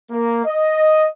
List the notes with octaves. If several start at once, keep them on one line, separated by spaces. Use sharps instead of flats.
A#3
D#5